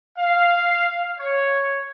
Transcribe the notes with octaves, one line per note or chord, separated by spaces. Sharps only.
F5
C#5